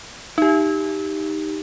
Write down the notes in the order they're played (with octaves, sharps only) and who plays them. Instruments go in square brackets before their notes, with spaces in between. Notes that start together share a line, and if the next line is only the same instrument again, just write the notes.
[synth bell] D#4 G4